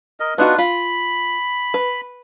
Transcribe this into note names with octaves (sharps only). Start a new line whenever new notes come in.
A#4 D#5
B3 D4 D#4 F4 F#4 B4
F4 B5
B4